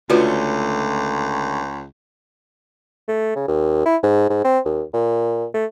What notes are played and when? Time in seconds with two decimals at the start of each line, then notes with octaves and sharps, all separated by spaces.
0.10 C#2 D3 A3 C#4 F4 F#4 B4
3.08 A3
3.36 C#3
3.48 D#2
3.86 E4
4.03 G#2
4.30 G#2
4.44 C4
4.65 D#2
4.94 A#2
5.54 A3